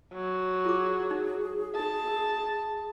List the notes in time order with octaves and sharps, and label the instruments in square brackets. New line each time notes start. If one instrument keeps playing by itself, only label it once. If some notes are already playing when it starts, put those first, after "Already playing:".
[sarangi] F#3
[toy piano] F4 D6 [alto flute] G#4
[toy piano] D#4
[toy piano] D#4 A4 [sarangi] A5
[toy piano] A#4